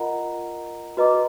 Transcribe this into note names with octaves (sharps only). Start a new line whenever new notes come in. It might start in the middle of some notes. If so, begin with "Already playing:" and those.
Already playing: F4 A#4 D#5 F#5 A#5
F#4 B4 D#5 A#5 D6